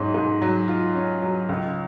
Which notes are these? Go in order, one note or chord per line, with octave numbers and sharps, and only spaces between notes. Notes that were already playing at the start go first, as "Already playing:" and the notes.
Already playing: G#2 F#3 C#4
G#2
F#3
F4
C#4
F#3
C#2